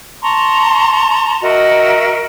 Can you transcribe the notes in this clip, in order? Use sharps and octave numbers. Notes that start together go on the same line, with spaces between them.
A5 A#5 C6 C#6
F#4 A#4 D#5 E5